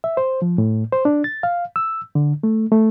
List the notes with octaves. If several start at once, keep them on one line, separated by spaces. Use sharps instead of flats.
E5
C5
F3
A2
C5
D4
A6
F5
E6
D3
A3
A3